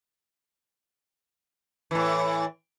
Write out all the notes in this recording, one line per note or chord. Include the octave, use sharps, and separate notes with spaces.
A2 E3